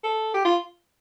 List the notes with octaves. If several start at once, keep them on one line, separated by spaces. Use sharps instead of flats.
A4
G4
F4